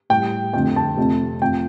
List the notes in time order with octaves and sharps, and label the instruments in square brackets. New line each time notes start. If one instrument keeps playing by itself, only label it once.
[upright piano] A2 G3 G5
F2 D3 A3 G5
A5
F2 C3 A3
F2 F3 A3 G5